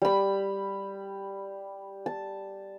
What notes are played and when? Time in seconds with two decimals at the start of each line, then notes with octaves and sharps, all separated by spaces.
0.02 G3 B5
2.06 A5